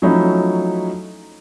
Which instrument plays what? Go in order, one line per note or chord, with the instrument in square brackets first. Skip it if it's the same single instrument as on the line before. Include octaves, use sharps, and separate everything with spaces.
[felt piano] F3 F#3 A3 C#4 D#4 E4